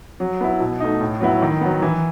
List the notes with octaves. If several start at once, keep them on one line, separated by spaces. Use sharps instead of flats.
F#3
B3 E4
B2
A3 D#4
A2
F#3 B3 E4
D#3
F#3 B3
E3